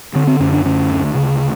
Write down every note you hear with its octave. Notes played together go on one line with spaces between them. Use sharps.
D3 C4
C4
F#2 C#4
D4
D3 C#4
D2
C#3